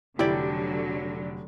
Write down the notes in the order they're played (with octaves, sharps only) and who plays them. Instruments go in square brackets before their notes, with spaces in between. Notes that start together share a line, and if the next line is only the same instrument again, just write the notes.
[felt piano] F1 D7 [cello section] D3 F#3 [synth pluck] E4 [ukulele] G4 D5